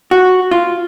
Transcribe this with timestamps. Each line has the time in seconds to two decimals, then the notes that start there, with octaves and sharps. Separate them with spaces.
0.11 F#4
0.51 F4